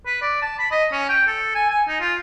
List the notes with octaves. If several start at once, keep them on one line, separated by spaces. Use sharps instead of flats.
B4
D5
A5
B5
D#5
C#4
G5
A4
G#5
G#5
D#4
F4